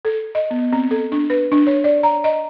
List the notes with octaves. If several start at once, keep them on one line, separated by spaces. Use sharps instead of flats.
A4
D#5
B3
C4
A4
D4
B4
D4
C#5
D5
A#5
D#5